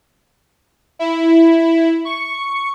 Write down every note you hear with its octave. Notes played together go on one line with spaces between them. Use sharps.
E4
C#6